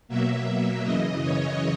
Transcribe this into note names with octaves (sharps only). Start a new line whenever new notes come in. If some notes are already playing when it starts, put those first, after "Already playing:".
B2 F#3 A#3 E5
F#2 C#3 E3 D#5
C#5